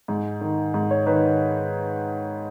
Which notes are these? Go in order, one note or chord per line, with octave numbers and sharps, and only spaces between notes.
G#2
D#3
G#2
C#5
D#3 B4